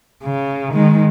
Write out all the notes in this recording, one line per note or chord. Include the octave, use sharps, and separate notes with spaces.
C#3
D#3 G#3